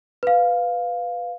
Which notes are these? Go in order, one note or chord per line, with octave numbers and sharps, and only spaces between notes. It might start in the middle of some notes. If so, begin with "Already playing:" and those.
B4 F5